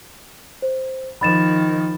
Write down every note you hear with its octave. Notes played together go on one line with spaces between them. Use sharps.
C5
D#3 F3 B5 A6 E7